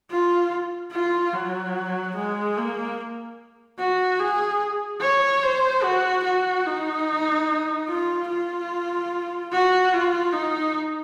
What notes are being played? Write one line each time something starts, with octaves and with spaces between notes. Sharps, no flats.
F4
F4
F#3
G#3
A#3
F#4
G#4
C#5
C5
F#4
F#4
D#4
F4
F4
F#4
F4
D#4